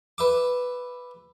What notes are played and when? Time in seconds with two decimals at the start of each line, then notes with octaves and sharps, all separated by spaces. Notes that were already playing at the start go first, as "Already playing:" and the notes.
0.18 B4 E5 D6